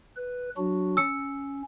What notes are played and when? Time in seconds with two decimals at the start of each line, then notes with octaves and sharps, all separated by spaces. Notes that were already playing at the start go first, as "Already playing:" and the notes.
0.17 B4
0.57 F#3 D4 F#4
0.97 C#4 E6 C#7